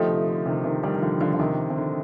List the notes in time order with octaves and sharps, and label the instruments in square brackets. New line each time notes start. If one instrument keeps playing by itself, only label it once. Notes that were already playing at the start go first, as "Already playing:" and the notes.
Already playing: [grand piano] D3 [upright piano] F3 A3 D#4 G4
[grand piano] C3
D3
C3 D#3
C3 D#3
D#3 G3
D#3
D3 F3
D3 F3
F3
C3 D#3
C3
D3